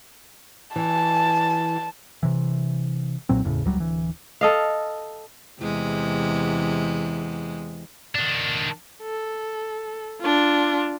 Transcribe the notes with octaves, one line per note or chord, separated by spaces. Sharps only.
E3 A5
C3 E3
B1 A#2 F#3 C4
F#1 E2 A2 C#3
D#1 C#2 F#3 G3
D1 E3
A4 D#5 F5
E2 C3 G#3
D#3 D4
A4
D4 F4